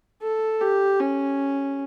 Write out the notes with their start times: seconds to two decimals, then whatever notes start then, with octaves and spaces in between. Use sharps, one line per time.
0.22 A4
0.61 G4
1.00 C#4